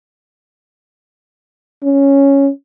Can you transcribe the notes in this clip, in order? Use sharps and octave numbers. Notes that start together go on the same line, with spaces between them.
C#4